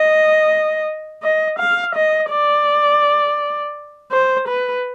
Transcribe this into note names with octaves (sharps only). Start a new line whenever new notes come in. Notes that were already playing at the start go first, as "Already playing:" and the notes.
Already playing: D#5
D#5
F5
D#5
D5
C5
B4